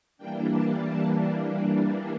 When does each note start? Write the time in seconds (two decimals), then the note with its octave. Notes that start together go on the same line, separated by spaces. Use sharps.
0.17 E3 G3 A#3 D4 G5
0.52 A5
0.87 A5